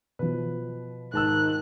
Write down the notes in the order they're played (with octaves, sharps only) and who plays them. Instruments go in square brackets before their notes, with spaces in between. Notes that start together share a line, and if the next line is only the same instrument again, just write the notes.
[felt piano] B2 F3 [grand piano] B4
[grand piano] G#2 A5 E6 [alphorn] D#3 [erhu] F#6